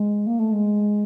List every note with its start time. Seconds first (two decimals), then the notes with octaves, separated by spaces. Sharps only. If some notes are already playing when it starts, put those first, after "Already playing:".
Already playing: G#3
0.26 A#3
0.39 A3
0.52 G#3